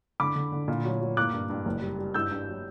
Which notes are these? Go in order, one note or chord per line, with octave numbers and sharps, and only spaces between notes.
D3 B5 D6
D3
D3
A#2
F#3
F#3
A#3 D6 F#6
G2
G2
F#1
G3
G3
G2 E6 G6
G2
F#3